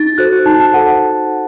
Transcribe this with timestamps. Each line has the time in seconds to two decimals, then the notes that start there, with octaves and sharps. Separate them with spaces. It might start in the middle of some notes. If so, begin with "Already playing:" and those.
Already playing: D#4 A6
0.18 F#4 A4 C5 F#6
0.46 D#4 A5
0.60 A5
0.73 A4 C5 F#5